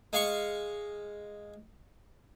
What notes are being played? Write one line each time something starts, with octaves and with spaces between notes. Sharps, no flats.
G#3 F5 C#6